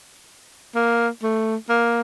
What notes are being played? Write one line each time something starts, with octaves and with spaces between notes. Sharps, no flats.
A#3
A3
A#3